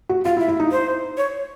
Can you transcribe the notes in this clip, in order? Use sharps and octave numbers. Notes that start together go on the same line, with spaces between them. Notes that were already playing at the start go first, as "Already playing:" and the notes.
F#4
F4 F5
E4
E5
E4
D#4
C5
C#5